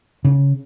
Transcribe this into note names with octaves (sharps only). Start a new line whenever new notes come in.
C#3